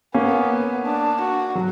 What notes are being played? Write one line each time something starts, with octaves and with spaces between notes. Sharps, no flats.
A#3 B3 C#4
D4
F#4
F#3